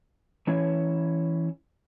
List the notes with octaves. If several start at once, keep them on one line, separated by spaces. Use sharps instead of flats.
E3 C#4 E4 C#5